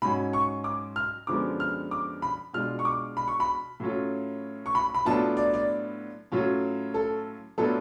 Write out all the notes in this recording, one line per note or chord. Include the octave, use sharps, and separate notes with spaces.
G#2 F#3 C#4 B5
C#6
D6
F6
F#2 D3 F3 G#3 B3 D6
F6
D6
B5
B2 G#3 D4 F4 F6
C#6
D6
B5
C#6
B5
A2 F#3 C#4 F4
C#6
B5
B5
A2 F#3 B3 D4 F4 A5
D5
D5
A2 F#3 C#4 F4
A4
A2 F#3 B3 D4 F4 A4